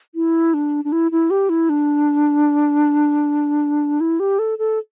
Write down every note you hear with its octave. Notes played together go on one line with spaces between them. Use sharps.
E4
D4
D4
E4
E4
G4
E4
D4
E4
G4
A4
A4